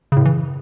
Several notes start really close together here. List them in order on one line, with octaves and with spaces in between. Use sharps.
C#3 A2 F#2 E3